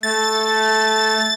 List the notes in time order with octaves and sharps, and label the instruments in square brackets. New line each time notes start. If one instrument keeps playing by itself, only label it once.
[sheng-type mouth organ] A3 [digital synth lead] A6